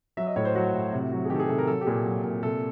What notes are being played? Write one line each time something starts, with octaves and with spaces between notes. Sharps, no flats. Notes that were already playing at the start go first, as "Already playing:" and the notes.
F#3 E5
D#5
A2 C#5
C5
F#3 F#4
A2
C3
F#3
G#4
D#3 G4
A4
G#4
C3 A4
A#4
F#3 A4
G4
A#2 G#4
F#3
A#2
C3 A4